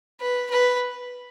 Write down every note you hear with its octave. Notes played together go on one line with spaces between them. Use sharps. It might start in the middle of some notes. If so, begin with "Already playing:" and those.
B4
B4